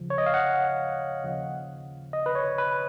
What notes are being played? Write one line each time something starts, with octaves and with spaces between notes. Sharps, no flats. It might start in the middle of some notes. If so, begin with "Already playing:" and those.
Already playing: D#2 C#3 F3
C#5
D#5
F5
F#5
D#2 C#3 F3
D#5
B4
C#5
B4